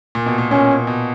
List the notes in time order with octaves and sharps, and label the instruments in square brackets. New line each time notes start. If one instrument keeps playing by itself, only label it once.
[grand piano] A#2
B2
A#2
[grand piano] A#2 [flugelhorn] C#4
[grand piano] B2